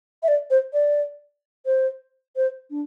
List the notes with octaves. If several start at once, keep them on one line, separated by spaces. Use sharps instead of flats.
E5
D5
C5
D5
C5
C5
D4